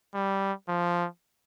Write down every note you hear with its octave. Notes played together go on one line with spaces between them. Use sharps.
G3
F3